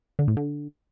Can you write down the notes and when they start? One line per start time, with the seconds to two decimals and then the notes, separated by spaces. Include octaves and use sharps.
0.19 D3
0.28 A2
0.37 D3